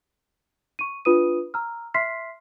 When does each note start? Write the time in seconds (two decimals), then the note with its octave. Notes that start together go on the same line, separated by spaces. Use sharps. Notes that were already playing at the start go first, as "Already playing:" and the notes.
0.79 C#6 D#7
1.05 D4 F4 B4 D#6 D#7
1.54 A#5 E6 F6
1.94 E5 C6 F6 B6 C7